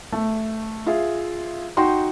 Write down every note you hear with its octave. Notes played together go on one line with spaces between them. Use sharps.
A3
F4 G#4 E5
D#4 F#4 G5 C6